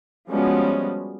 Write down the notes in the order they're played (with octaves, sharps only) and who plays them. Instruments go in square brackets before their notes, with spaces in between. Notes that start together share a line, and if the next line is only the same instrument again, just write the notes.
[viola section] F3 G3 G#3 B3 C#4 F#4